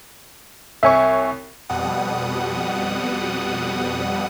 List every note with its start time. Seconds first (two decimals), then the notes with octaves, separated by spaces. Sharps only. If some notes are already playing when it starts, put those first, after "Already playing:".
0.83 C2 C#5 E5 G#5 C#6
1.69 F2 B2 G3 F#5 D#6